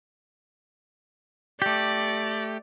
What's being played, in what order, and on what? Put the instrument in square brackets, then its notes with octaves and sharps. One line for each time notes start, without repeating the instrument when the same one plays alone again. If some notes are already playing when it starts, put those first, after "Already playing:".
[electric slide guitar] A3 G4 [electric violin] D5